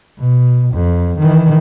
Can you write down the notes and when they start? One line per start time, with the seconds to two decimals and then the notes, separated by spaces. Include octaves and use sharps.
0.19 B2
0.74 F2
1.19 D#3 E3